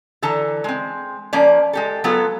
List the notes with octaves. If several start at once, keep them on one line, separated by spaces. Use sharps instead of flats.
D3 E3 A4 A5 A#5
G#3 C4
F3 A#3 C#4 C#5 D5
G#3 G4 A4
F#3 G#3 B3 F4 A4